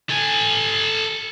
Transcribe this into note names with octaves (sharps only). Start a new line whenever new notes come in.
A4 G#5